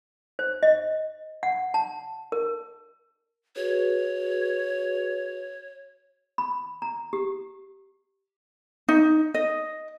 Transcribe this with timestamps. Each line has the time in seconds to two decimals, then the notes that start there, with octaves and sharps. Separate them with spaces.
0.39 C5
0.63 D#5
1.43 F#5
1.74 A5
2.32 A#4
3.56 F#4 G#4 B4 C#5
6.38 B5
6.82 A#5
7.13 G4
8.89 D#4
9.34 D#5